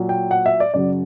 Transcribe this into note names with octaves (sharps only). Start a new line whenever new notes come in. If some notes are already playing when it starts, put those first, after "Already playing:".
Already playing: A#2 F#3
G5
F#5
E5
D5
F#2 C#3 F#3 D5